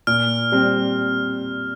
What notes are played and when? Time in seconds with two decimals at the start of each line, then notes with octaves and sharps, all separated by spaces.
0.07 A#2 F6
0.52 G3 C4